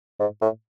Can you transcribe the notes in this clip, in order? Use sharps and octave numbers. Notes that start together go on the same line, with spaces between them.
G#2
A2